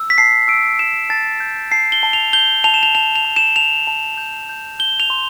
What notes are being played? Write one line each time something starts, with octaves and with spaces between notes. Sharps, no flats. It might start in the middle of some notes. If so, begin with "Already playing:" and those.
Already playing: E6
B6
A5 C7
E6 D7
E6 E7
A5 A6
G6
A5 C7
G7
A5
F7
G6 G7
A5 F7
E7
F7
A5 F7
F7
A5
E7
A5 F7
A5
G6
G6
G6 G7
F7
C6